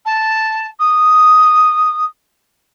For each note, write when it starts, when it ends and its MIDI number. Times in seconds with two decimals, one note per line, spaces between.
0.05 0.66 81
0.79 2.04 87